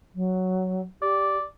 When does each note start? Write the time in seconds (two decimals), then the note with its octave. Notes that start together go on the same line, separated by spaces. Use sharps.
0.15 F#3
1.02 G4 D5